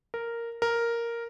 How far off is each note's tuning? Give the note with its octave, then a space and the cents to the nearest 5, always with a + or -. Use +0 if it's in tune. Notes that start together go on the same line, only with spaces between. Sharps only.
A#4 -5
A#4 +0